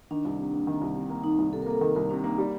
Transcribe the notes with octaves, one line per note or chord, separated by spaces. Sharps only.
D#3 D4
C2
C3
A#3
D#3
C2
C3
A#3
D#3 D#4
C2
C3 A4
A#4
A#3 A4
D#3 A#4
C2 A#4
C3 D4
A#3 D#4
G3